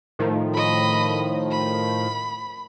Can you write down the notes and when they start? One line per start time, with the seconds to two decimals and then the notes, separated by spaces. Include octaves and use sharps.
0.19 A2 D#3 F3
0.54 D#5 B5
1.51 B5